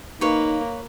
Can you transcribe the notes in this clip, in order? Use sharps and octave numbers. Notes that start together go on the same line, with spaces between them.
A#3 D#4 B4 C#5 F5